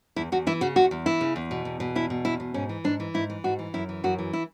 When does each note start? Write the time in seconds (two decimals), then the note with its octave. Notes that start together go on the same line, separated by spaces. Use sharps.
0.16 E2 E4
0.32 E2 F#4
0.47 E3 E4
0.61 C#3 F#4
0.76 E2 F#4
0.91 E2
1.06 E3 E4
1.21 C#3
1.36 E2
1.51 B2
1.65 E2
1.80 B2
1.95 E2 E4
2.10 B2
2.25 E2 E4
2.40 B2
2.54 G#2 C#4
2.69 E3
2.84 G#2 D4
3.00 E3
3.14 G#2 E4
3.30 E3
3.44 G#2 F#4
3.59 E3
3.74 F#2 E4
3.89 E3
4.04 F#2 F#4
4.18 E3
4.33 E4